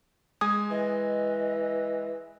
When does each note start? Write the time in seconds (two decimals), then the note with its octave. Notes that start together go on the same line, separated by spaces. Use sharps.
0.41 G#3 G#5 D#6 G#6
0.71 E3 D#5